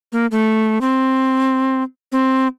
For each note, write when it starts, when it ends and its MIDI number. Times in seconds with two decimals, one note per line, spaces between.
0.12 0.26 58
0.31 0.78 57
0.81 1.83 60
2.12 2.48 60